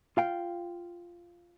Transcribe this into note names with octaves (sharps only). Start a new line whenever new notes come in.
F4 F5 G5